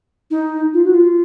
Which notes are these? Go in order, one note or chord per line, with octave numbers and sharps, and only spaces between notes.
D#4
F4
F#4
F4